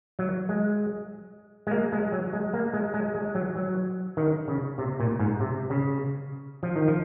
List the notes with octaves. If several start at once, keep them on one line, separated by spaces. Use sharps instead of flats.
F#3
G#3
G#3
A#3
G#3
F#3
G#3
A#3
G#3
G#3
G#3
F#3
F#3
D#3
C#3
C3
A#2
G#2
C3
C#3
F3
D#3
F3